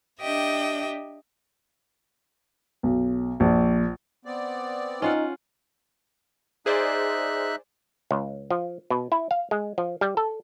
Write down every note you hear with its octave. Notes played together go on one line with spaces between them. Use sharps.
D4 G4 D#5 E5 G5
B1
A#1
B3 C4 D5
C#4 D#4 F4 F#5
D#4 G#4 C5 D5 E5 F#6
C#2
F3
B2
E4
F5
G#3
F3
G3
A4